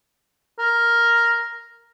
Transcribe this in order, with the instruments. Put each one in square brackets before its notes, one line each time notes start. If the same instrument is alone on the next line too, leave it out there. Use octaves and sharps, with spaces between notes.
[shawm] A#4